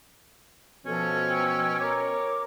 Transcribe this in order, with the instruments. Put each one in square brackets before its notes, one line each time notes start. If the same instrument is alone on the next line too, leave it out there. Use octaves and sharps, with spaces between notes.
[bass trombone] B2 [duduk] F3 [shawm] C#4 [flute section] A4
[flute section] G5 E6
[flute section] A#4 D6 [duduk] C#5